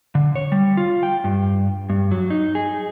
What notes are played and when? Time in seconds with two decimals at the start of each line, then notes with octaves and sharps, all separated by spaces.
0.15 D3
0.36 C#5
0.52 G3
0.77 F4
1.03 G5
1.24 G2
1.90 G2
2.11 F#3
2.30 D#4
2.55 G#4